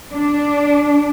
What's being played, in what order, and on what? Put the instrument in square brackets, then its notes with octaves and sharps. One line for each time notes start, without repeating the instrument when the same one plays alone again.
[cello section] D4